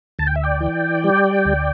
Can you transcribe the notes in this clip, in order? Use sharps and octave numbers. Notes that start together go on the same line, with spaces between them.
D2 A5
G5
E5
D5 G5
E3
G3
D2